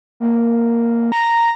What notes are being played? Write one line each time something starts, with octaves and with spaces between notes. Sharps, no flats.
A#3
A#5